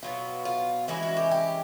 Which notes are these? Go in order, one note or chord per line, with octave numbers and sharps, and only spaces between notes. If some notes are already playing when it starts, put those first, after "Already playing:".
B2 F#3 B3 F4
F4
E3 G#3 C#4 E4 F#4
F#4
G4
G4